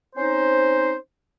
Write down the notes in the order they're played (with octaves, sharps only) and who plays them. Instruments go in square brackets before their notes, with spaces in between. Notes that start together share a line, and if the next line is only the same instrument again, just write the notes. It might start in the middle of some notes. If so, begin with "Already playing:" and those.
[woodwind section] C4 C#4 D#4 C5